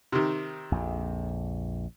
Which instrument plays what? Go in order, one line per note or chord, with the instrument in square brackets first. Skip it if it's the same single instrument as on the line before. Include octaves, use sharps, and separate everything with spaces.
[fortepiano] C3 D#3
[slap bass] A#1 F2